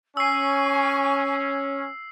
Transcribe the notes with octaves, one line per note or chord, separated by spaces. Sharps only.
C#4 G#5 C#6 E6 C7